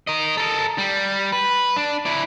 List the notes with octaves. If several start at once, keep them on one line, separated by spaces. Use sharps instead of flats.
A#4 D#5
A4 A#4
G3
B4
D4
E4 D5